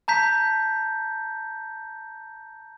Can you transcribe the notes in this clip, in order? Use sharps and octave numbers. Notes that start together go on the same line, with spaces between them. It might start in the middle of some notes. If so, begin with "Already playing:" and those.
A5 A#5 G6 B6